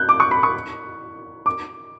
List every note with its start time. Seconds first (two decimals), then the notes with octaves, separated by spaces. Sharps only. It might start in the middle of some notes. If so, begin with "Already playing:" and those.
Already playing: F#6 G6
0.09 D6
0.20 C#6
0.31 B5
0.43 C#6
1.46 D6